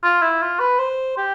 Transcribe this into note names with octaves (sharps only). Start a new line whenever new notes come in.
F4
E4
F4
B4
C5
G4